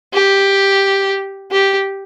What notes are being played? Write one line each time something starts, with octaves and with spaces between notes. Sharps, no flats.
G4
G4